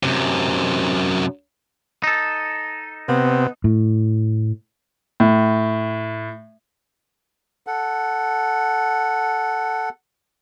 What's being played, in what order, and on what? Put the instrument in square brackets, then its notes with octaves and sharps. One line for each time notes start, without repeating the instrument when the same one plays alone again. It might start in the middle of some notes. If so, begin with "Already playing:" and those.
[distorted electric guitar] F#2 C3
[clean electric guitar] D#4 A4
[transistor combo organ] C3 [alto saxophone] B3
[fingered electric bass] A2
[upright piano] A2
[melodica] A4 F#5